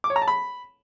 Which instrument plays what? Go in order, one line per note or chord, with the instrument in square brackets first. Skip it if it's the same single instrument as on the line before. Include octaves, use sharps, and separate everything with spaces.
[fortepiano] D6
C#5
A#5
A5
B5